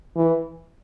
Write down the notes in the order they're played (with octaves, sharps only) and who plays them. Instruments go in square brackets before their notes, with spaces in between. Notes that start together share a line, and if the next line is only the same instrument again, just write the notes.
[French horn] E3